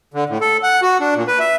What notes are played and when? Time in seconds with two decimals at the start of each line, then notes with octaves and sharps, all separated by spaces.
0.14 D3
0.29 A2
0.41 A4
0.63 F#5
0.82 F#4
1.00 D4
1.15 A#2
1.27 B4
1.40 E5